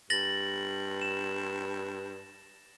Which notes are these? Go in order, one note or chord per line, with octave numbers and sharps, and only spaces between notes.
G2 A6 A#6 F#7
E7